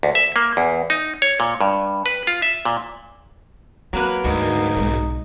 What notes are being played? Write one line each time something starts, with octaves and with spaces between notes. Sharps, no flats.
D2
E5
A#3
E2
D#4
C#5
A#2
G2
B4
F4
E5
A#2
F#3 A#3 C4 B4
D2 G#2 D#4 F#4
B1 G#3